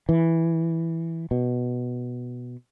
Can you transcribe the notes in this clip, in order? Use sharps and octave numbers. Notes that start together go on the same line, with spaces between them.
E3
B2